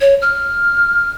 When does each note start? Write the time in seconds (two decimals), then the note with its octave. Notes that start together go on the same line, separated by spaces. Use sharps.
0.01 C#5
0.22 F6